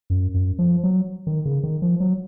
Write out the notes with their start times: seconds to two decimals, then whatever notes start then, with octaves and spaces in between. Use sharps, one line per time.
0.10 F#2
0.34 F#2
0.59 F3
0.84 F#3
1.27 D#3
1.45 C#3
1.63 D#3
1.82 F3
2.00 F#3